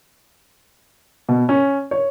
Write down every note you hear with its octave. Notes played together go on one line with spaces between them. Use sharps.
B2
C#4
C#5